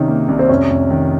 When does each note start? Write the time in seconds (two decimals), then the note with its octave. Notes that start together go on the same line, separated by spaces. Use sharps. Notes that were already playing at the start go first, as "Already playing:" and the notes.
Already playing: C2 C3 D#3 C#4 D#4
0.08 A#3
0.28 C2
0.39 C4
0.49 F1 C#4
0.70 F1
0.90 D#3